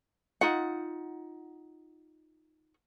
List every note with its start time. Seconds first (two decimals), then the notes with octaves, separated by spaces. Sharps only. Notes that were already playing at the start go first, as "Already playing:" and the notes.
0.41 D#4 F4 F#5